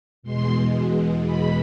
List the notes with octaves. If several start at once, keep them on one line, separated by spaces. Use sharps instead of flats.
E2 B2 G#3 C6
B5